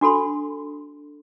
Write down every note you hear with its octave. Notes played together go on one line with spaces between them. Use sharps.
D4 F#4 A4 B5 C6